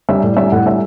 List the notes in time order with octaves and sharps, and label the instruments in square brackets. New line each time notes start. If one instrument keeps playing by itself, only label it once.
[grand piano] G3 E5
A2 D5
G3 E5
A2 F#5
G3 E5